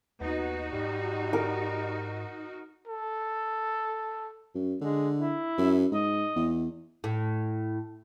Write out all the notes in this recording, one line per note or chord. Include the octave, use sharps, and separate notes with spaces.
D#2 B3 D#4 F#4
G#2 G3
A#4
A4
F#2
D3 G#3
E4
F#2
G#2 D#5
E2
A2